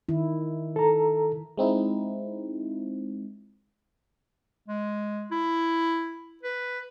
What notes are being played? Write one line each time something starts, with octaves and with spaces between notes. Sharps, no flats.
D#3 E4
A4 A#5
G#3 C4 D#4 E4
G#3
E4
B4